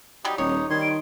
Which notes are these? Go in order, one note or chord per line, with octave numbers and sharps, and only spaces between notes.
F#3 G3 D#4 G4
D#1 D#4 C#5 D#6
D#3 G3 C6 G#6
D7